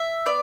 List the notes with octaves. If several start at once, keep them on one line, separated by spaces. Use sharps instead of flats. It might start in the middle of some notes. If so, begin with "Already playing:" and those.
Already playing: E5
B3 D5